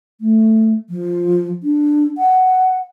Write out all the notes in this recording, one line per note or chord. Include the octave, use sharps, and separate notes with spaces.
A3
F3
D4
F#5